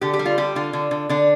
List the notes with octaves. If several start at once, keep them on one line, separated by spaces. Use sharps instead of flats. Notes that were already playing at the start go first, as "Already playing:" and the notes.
D3 G4
G4
G3
F4
D3 G4
D3 F4
D3
D3
D3 D4